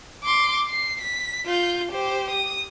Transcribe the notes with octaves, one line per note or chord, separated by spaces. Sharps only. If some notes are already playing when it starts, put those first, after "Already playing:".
C6 D6
C7
B6
F4 G6
G4 C5
D#6